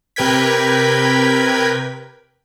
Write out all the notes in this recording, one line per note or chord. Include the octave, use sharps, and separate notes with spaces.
C3 A#4 B4 G5 G#6 B6